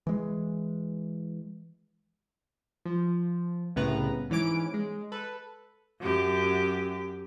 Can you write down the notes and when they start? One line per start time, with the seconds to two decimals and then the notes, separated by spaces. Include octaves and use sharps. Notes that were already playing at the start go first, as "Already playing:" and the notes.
0.07 E3 G#3
2.85 F3
3.76 C2 A2 C#3 B3 B4 A#5
4.30 G#2 E3 C#4 D6 D7
4.74 G#3
5.12 A4 B4
6.01 F#2 G4